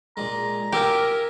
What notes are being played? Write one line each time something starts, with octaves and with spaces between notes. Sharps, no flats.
A#2 G#3 A#5
F4 G4 A#4 E5 G#5